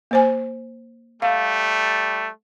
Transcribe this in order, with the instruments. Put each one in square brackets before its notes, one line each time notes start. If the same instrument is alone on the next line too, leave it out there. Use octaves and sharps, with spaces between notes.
[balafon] A#3 C5 G#5
[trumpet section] G3 A3 [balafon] F5